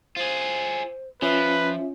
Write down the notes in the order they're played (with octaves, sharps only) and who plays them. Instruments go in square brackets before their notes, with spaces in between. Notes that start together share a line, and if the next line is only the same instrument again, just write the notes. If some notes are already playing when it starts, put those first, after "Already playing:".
[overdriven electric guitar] F4 G#4 [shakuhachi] C5
[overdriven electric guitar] F3 [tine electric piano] C#4 F4 [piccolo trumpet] B4 [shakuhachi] E5